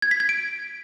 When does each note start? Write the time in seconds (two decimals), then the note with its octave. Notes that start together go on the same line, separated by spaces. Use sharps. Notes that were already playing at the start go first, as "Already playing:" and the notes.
0.02 G#6
0.11 B6
0.20 G#6
0.29 D7